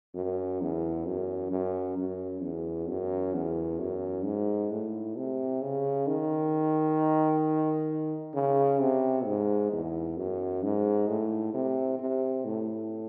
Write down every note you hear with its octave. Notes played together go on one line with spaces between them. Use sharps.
F#2
E2
F#2
F#2
F#2
E2
F#2
E2
F#2
G#2
A2
C3
C#3
D#3
C#3
C3
G#2
E2
F#2
G#2
A2
C3
C3
A2